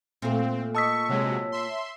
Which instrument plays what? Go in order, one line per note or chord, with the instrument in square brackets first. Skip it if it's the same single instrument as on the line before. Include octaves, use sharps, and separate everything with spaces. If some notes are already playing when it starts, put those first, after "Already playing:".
[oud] A#2 A3 [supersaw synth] C4 [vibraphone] F5 C6
[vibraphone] D#5 D#6 [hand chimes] A5 E6 B6 [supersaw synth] C#6
[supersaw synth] C3 F#3 G#3 [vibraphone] C#5
[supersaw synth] E5 C6